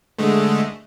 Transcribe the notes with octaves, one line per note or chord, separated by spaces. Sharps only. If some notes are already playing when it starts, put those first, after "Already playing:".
D3 G#3 A3